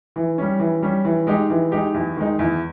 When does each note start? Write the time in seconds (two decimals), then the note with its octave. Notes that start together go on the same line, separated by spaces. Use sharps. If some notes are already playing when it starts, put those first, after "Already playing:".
0.16 E3
0.38 G3 C#4
0.59 E3
0.82 G3 C#4
1.05 E3
1.27 G#3 D#4 G4
1.50 E3
1.71 G#3 D#4 G4
1.94 E2
2.17 D#3 G#3 D#4
2.39 E2